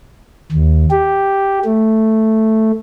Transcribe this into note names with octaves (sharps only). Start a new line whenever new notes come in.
D#2
G4
A3